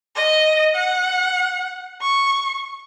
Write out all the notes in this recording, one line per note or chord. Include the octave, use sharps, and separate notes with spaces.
D#5
F#5
C#6